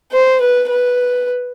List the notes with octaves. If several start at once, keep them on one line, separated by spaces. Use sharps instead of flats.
C5
B4
B4